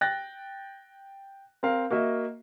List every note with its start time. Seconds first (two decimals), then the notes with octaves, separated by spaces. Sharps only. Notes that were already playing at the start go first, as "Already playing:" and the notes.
0.01 G5 F#6 A6 A#6
1.63 C4 A#4 F5
1.90 A#3 F#4 D#5 E5